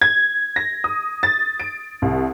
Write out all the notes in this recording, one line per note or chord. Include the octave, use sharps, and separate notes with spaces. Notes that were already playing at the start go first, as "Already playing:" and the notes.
G#6
A#6
D#6
A6
D7
C2